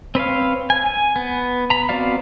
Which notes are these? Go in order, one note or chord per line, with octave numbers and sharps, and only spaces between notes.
C4 B4 C#5 F5
G#5
G#5
B3
A#5 B5
B3 C4 F#4 D5 F5